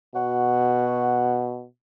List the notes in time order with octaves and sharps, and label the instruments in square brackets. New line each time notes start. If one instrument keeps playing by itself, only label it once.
[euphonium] B2 [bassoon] F#4